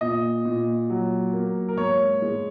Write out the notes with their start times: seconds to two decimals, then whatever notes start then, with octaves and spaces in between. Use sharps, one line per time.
0.01 A#2 D#5
0.45 A#2
0.90 F#3
1.33 A#3
1.69 A#4
1.77 G#2 C#5
2.22 G#3